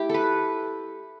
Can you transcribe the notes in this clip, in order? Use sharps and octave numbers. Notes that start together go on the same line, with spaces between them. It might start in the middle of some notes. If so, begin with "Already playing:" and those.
Already playing: A3 E4 G4
A4 B4